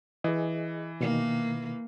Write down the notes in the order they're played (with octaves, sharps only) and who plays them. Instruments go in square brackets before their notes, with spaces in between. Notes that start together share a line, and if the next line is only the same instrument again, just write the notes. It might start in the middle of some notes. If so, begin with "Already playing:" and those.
[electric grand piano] E3 [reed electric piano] G#4 D#5
[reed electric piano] B2 D#3 [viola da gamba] A#3